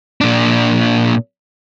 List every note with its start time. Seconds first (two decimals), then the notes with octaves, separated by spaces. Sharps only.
0.21 A#2 D4